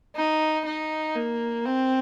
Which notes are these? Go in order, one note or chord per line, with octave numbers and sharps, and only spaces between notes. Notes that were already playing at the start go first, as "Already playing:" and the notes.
D#4
D#4
A#3
C4